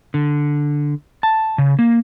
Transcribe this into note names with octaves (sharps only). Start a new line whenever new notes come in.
D3
A5
C#3
A#3